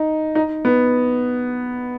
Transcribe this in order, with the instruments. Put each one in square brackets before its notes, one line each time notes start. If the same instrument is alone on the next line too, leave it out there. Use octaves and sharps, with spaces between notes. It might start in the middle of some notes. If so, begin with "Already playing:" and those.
Already playing: [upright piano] D#4
D#4
B3